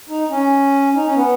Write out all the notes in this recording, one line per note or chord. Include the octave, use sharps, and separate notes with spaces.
D#4
C#4
D#4
C#4
B3